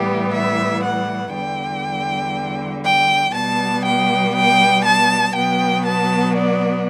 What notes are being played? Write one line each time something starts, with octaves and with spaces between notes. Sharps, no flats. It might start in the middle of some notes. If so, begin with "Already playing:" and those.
Already playing: A2 E3 G3 B3 G4
E5
F#5
E2 D3 G3 G5
G5
B2 G3 B3 A5
G5
G5
A5
B2 F#3 B3 G5
A5
D5